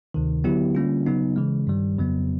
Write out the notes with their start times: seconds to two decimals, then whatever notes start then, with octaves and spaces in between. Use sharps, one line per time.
0.14 D2 C3 D#3
0.44 D3 F#3 B3 E4 G4
0.75 D3 G3 A#3 C#4 F4
1.06 C#3 F#3 B3 D#4
1.36 C#3 E3 G#3
1.67 G2 D#3 G3
1.98 F2 C#3 F#3 B3